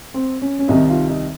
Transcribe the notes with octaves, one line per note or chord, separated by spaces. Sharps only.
C4
C#4
C#4
C2 C3 D#3 D#4
F4
D#4